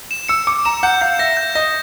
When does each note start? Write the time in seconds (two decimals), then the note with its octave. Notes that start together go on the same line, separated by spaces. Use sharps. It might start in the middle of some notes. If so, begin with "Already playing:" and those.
0.11 E7
0.29 E6 C#7
0.47 D6 C#7
0.65 A#5 E7
0.83 F#5 G6
1.01 F5 G6
1.19 E5 A#6
1.37 G6
1.55 D#5 A#6